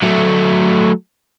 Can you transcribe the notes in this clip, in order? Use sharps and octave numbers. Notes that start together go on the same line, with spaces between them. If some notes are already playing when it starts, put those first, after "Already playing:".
F#3 A3